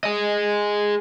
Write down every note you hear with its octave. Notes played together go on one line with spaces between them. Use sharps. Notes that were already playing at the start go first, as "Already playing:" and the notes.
G#4 D#5